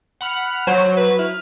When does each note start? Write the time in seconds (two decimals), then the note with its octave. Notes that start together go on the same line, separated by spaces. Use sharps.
0.21 F#5 B5 F6
0.67 F#3 C5
0.97 B4
1.19 E4 F6